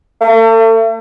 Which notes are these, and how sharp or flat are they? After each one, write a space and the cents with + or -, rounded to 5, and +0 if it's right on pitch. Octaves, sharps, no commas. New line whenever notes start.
A3 +40